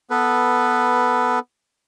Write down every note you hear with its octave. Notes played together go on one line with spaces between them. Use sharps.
B3 A4 B4